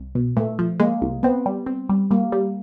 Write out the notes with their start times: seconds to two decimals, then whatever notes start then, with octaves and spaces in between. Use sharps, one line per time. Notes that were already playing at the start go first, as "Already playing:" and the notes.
Already playing: C2
0.15 B2
0.37 A#2 A3
0.59 F3
0.80 G#3 A#3
1.02 C2
1.23 B3 C4
1.46 G3
1.67 C4
1.89 G3
2.11 G3 A#3
2.32 G3